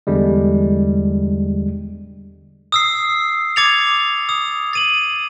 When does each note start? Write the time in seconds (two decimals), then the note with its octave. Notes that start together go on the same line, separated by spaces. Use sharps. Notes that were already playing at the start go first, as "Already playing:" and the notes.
0.07 E2 D3 G3 G#3
2.72 D#6 E6 C7
3.56 D6 G#6 A6 C#7 F7
4.29 D#6
4.73 A6 D#7 F#7